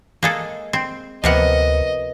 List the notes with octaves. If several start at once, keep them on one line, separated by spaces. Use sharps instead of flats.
G#3 A#3 G#4 A4
C4
D2 C3 F3 A#3 B3 A#4 D#5 F#5